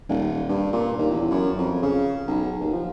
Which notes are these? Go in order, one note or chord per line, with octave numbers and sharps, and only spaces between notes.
D#1
G2
A#2
D#2
E2
F#2
F2
C#3
B1
D#2
F3